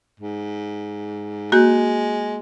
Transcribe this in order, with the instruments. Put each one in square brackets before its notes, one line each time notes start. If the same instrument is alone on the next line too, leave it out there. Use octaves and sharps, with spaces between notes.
[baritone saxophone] G#2
[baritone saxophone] G#3 [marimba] A#3 F#4 G6